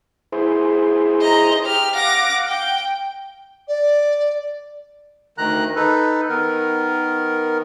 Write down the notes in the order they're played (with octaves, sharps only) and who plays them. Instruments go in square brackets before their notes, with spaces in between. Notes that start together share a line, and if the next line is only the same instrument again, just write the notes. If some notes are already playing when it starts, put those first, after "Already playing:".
[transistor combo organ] E4 G#4 C5
[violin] D#5 A#5
G4 F6
[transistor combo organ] F5 F#5 [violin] D6 A#6
[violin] G5
[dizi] D5
[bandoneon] D2 D#3 A#5 F#6
D#4 A4 B4
D#3 B3 A#4